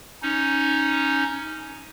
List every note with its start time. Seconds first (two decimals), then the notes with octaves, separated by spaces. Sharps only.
0.22 C#4 D#4